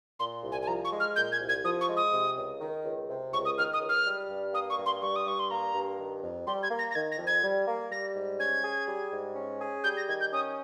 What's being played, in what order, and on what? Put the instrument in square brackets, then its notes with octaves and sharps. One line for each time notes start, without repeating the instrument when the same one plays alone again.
[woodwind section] A#2 [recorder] C6
[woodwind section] C2
[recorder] G#5
G#5
[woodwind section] F3 [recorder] A#5
[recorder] C#6
[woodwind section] G#3
[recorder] F6
[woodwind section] A#2 [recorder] G6
[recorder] G#6
[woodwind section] C2
[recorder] G#6
[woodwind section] F3 [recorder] D#6
[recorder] C#6
[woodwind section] G#3
[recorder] D#6
[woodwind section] C3
C#2
D#3
C#2
C3
[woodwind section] C#2 [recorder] C#6
[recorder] D#6
[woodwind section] D#3 [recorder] F6
[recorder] D#6
[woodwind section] C#2
[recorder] F6
[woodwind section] G3
G2
[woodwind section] A#3 [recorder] D#6
[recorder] C#6
[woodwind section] G2
[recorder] C6
[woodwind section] G3 [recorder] C#6
[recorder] D#6
[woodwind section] G2 [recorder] C#6
[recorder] C6
[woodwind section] A#3 [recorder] A#5
[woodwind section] G2
D#3
F2
[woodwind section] G3 [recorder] C6
[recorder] G#6
[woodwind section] A#3
[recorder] A#6
A#6
[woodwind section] D#3 [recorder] G#6
[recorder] A#6
[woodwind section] F2
[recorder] G#6
[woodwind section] G3
A#3
[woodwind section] G3 [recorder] A#6
[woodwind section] G#2
[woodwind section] C#4 [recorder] G#6
[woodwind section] G#4
G3
G#2
C#4
G#4
[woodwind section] G3 [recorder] G6
[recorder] A#6
[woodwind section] D#3 [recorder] G#6
[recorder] G6
[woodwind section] C#4 [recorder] D#6